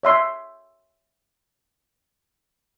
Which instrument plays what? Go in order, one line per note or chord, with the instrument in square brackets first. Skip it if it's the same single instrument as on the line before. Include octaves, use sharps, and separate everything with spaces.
[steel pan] C#5 E5 C6